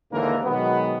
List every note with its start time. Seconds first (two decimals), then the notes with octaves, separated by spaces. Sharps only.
0.12 D#2 G#2 D3 E3 A#3 A#4
0.44 B2 D#3 F#3 G#3 B3